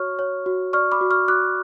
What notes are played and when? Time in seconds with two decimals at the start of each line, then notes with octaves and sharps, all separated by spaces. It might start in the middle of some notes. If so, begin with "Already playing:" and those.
Already playing: F#4 C#5 C#6 F6
0.19 C#5
0.46 F#4
0.73 D5 C#6 F6
0.92 B5 D6
1.01 F#4
1.11 C#6 F6
1.28 F#4 D6 F#6